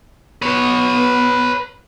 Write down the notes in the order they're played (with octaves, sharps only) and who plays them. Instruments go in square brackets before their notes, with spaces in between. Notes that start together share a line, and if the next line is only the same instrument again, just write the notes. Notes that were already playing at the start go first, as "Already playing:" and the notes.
[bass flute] B3 [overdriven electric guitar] B4 C#5